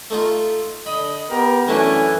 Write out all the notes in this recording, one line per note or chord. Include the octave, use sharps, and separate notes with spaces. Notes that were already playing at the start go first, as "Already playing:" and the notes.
A3 D#4 F4
D3 D#5 B5
B3 G4 A#4
F#2 E3 A3 C#4 D4